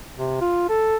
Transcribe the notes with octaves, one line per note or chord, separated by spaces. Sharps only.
C3
F4
A4